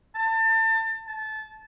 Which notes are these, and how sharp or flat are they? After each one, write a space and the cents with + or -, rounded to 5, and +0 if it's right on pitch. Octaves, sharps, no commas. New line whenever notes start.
A5 +30
A5 -20